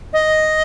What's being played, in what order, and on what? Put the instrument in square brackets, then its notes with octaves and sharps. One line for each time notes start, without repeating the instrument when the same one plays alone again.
[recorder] D#5